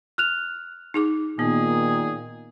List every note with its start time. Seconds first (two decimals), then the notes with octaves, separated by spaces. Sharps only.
0.18 F6 F#6 F7
0.94 D#4 G#4 D6
1.39 A#2 D#3 B3 G#4